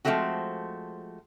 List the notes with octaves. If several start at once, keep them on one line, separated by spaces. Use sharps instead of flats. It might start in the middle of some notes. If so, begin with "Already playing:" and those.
F3 F#3 G#3 A3 C4 F#4